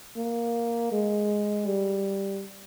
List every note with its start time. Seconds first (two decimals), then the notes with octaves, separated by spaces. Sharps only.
0.17 A#3
0.92 G#3
1.67 G3